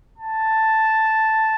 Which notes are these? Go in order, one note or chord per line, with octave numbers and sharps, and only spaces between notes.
A5